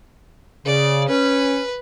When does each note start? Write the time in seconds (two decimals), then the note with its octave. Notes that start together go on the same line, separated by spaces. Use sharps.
0.66 C#3 D5
1.08 C#4 B4